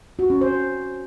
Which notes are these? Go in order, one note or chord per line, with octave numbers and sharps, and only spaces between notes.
F#4
C#4
C5